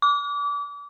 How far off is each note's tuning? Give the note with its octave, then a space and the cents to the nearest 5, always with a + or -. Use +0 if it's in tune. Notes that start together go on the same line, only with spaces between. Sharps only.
D6 -30